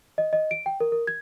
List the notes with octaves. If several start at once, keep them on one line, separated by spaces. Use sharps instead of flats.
D#5
D#5
D7
G5
A#4
A#4
G#6